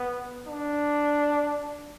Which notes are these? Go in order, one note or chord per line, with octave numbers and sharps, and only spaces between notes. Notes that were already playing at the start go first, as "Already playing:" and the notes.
Already playing: B3
D4